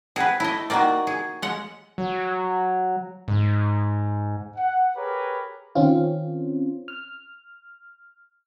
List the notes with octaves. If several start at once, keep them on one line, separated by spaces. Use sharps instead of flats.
C4 G#4 B4 F#5
A3 E4 D#5
C3 D#3 A#3 F#4 D5
G#4
G#3 F#5
F#3
G#2
F#5
G4 G#4 A#4 B4 C#5
D#3 C4 C#4 F4
F6